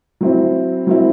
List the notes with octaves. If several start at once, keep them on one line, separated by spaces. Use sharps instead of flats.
F#3 C4 E4
F#3 C4 E4